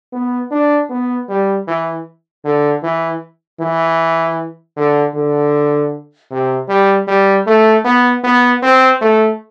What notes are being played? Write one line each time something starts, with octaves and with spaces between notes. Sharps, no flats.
B3
D4
B3
G3
E3
D3
E3
E3
D3
D3
C3
G3
G3
A3
B3
B3
C4
A3